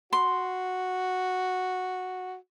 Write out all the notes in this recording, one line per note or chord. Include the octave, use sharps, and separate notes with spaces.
F#4 C6